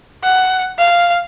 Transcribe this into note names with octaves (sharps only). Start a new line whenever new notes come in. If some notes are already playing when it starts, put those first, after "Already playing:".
F#5
F5